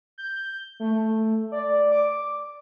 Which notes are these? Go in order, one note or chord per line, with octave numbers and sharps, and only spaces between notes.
G6
A3
D5
D6